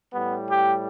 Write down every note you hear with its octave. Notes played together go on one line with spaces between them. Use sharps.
A2 G3 B3
G4